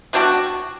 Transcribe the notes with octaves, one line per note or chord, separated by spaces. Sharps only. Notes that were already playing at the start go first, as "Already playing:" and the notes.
B2 G3 D4 F#4